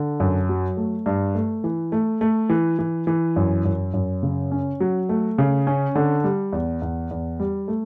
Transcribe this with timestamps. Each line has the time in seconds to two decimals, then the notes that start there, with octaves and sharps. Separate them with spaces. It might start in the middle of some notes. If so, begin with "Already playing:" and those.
Already playing: D3
0.20 F#2
0.49 F#3
0.77 A3
1.06 G2
1.35 A3
1.64 E3
1.92 A3
2.21 A3
2.49 E3
2.79 E3
3.07 E3
3.36 F#2
3.65 F#2
3.94 F#2
4.23 C#3
4.51 C#4
4.80 F#3
5.09 A3
5.38 C#3
5.67 C#4
5.95 D3
6.24 G3
6.52 E2
6.82 E2
7.11 E2
7.39 G3
7.68 A3